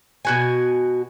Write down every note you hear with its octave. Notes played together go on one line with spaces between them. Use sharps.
B2 F#4 G#5